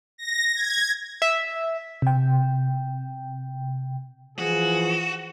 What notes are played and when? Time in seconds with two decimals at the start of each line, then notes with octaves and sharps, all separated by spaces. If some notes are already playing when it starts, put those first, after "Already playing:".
0.18 A#6
0.55 G#6
1.22 E5
2.02 C3 G5
4.39 E3 F3 F#4 G#4